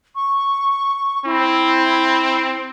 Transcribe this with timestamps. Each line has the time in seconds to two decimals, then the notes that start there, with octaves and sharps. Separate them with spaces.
0.15 C#6
1.25 C4 E4